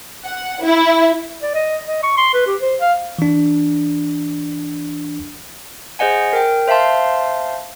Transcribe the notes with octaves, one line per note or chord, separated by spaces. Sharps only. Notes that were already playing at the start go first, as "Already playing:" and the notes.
F#5
E4
D5
D#5
D#5
C#6
C6
B4
G4
C5
F5
E3 D4
G#4 C5 D#5 F#5 G#5
A#4 G5
C5 E5 F5 A5 C6